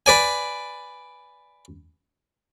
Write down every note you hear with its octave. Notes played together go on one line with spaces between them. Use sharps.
B4 D5 G#5